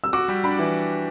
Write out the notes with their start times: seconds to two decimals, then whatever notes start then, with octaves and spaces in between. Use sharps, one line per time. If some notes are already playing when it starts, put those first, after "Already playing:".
0.04 E6
0.13 F#4 D6
0.28 G3
0.44 D4 B5
0.59 E3